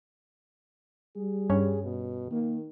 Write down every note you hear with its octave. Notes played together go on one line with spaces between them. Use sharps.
G3 G#4
G2 C#4 C#5
B2
D#3 A#3